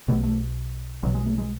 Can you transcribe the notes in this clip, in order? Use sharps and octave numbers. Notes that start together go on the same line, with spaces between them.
B1 B2 A3
A3
B1 B2 F#3
G#3
A3
G#3